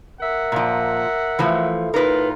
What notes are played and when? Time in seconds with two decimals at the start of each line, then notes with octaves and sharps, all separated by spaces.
0.21 A#4 E5 F#5
0.52 A#2 F3
1.39 E3 F3 A3
1.94 A2 D#4 F4 A#4 B4